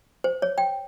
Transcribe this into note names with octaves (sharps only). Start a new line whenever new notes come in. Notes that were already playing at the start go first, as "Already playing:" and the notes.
C5
C#5
G5